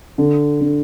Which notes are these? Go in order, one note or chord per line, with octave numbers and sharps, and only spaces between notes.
D3
D3